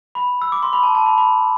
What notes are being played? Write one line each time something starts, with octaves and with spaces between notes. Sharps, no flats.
B5
E6
D6
C6
B5
A5
A5
B5
B5